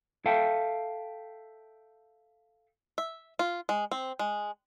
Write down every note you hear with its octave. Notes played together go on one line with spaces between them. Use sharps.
A4 E5 F5 G5 A5
E5
F4
G#3
C4
G#3